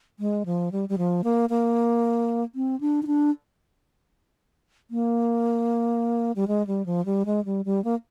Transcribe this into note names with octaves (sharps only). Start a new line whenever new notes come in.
G#3
F3
G3
G3
F3
A#3
A#3
C4
D4
D#4
D4
A#3
G3
G#3
G3
F3
G3
G#3
G3
G3
A#3